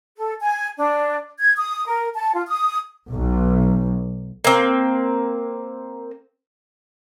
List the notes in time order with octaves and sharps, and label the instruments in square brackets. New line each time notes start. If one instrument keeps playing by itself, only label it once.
[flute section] A4
G#5
D4
G#6
D#6
A#4
A5
F4
D#6
[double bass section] B1
[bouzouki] A#3 C4